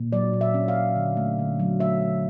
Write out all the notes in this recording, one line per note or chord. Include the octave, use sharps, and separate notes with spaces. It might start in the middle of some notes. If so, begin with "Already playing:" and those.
Already playing: A#2
F#3 D5
A#2
E5
C#4
F5
C#4
D3
A3
D3
F#3
A3 E5
D3